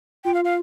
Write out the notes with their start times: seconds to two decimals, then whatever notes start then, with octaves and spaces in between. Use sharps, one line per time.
0.25 F4 G5
0.34 F5
0.44 F5